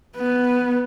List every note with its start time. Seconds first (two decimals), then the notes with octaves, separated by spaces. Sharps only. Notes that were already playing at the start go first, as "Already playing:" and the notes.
0.17 B3